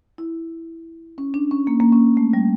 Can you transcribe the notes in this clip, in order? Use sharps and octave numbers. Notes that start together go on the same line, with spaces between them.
E4
C#4
D4
C#4
A#3
A#3
C#4
A3
G3